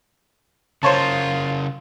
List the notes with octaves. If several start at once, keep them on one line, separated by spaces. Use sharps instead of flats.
C#3 F4 A#4 C5 C#5 A5